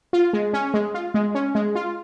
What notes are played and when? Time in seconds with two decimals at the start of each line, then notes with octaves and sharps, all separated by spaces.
0.13 F4
0.33 G#3
0.53 C#4
0.74 G#3
0.94 F4
1.14 G#3
1.35 C#4
1.55 G#3
1.75 F4